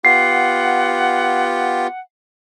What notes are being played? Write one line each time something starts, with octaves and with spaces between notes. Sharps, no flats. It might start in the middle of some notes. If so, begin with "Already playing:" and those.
B3 F4 G4 F#5 C7